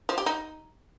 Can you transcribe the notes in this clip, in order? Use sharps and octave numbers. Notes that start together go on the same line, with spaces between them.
F3
G4
D#4